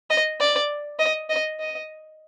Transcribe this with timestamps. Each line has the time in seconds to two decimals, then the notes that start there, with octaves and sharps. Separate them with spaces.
0.10 D#5
0.40 D5
0.99 D#5
1.29 D#5
1.60 D#5